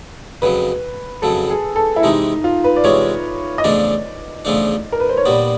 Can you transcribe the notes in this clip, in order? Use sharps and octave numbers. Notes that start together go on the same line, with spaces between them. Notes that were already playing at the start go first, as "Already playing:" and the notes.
F2 C#3 F#3 B4
F2 C#3 F#3 A4
G#4
A4
E4
C3 E3 G#3 D#4
F4
B4
D5
C3 E3 G#3 C#5
D#5
E2 C#3 F3 A3 D4 D5
E2 C#3 F3 A3 D4
A#4
B4
C5
C#5
A#2 G3 B3 D5